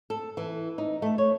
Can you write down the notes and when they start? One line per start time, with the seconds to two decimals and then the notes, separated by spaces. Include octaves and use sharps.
0.10 A4
0.37 E3
0.78 D#4
1.02 A3
1.18 C#5